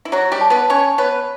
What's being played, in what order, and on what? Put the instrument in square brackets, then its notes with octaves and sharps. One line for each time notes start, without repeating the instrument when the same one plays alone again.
[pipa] E4
[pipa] F#3 F#4 [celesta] C#5
[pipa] G3 G4
[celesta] A5
[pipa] B3 B4
[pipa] C#4 C#5 [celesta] A5
[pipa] B3 B4 [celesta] C#5